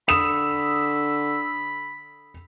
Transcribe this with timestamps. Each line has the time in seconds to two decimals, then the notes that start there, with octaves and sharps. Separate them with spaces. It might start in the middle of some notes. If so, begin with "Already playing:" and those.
0.08 D3 B5 D#6 E6 E7